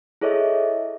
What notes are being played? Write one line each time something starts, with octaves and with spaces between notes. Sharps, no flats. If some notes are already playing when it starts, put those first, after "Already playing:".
E4 G#4 A4 C#5 D#5 E5